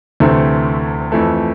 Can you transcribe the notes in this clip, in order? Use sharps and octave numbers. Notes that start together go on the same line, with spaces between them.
D2 C3 E3 A3 C4
F2 E3 A3